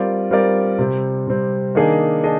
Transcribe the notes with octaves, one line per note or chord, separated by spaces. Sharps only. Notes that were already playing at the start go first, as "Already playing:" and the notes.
Already playing: G3 C4 F4 A#4 D5
G3 C4 F4 A#4 D5
C3 G3 C4
C3 G3 C4
D#3 A#3 D4 G#4 D#5
D4 G#4 D#5